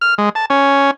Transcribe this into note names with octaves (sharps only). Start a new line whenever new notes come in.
F6
G#3
A5
C#4